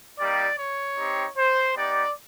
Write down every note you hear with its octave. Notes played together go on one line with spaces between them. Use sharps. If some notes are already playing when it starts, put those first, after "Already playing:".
G3 A#3 D#4 G4 D5
C#5
C4 D#4 G4
C5
B3 D#4 G4 D5